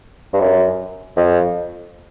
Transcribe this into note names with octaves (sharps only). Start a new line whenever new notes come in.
G2
F#2
F2